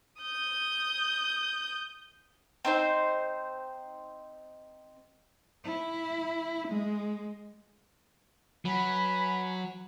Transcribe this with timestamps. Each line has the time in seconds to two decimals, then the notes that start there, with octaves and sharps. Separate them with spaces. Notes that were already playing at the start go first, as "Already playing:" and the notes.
0.22 D#6 G6
2.65 C4 D#4 C5
5.64 E4
6.68 G#3
8.65 F#3 B4 G#5 B5